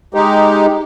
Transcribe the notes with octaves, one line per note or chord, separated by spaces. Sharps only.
G#3 D#4 G4